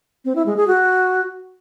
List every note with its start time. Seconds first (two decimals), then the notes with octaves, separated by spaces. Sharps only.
0.25 C4
0.36 E4
0.46 G#3
0.57 G#4
0.67 F#4